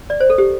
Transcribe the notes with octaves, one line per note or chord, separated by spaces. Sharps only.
D5
C5
A4
G4